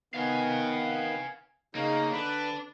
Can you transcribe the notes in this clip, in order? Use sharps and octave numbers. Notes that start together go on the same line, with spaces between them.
D#3 B3 F5 G#5
C#3 A#3 D#4
D3 D4 B4